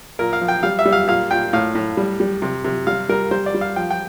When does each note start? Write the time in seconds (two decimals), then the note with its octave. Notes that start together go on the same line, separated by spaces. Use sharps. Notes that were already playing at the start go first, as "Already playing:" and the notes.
0.19 A#2 A#4
0.33 F5
0.41 F3
0.48 G5
0.63 G3 F5
0.79 E5
0.85 G3
0.92 F5
1.07 A#2 F5
1.31 A#2 G5
1.53 A2 F5
1.75 A2
1.97 G3
2.20 G3
2.42 C3
2.64 C3
2.87 G3 F5
3.09 G3 A#4
3.31 G3 C5
3.46 D5
3.54 G3
3.61 F5
3.76 F3 G5
3.90 G5